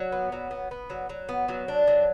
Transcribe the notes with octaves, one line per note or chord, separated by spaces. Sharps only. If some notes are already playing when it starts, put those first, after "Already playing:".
Already playing: F#3
B3
F#3
B3
B3
F#3
F#3
B3
F#3
D4
F#3